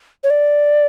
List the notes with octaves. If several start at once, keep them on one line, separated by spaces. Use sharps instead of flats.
C#5
D5